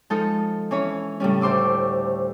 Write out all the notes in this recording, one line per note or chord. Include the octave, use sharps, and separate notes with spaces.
F3 G#3 D#4 F4 A4
E3 C#4 C#5 B5
A2 C#3 G3 C#4
D2 C5 C6 D6 E6